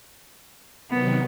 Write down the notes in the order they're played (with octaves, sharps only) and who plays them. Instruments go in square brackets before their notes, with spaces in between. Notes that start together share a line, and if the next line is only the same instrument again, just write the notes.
[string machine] C3 D#3 F#3 [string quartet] B3